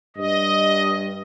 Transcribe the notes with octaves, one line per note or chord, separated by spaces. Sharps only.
G2 D#5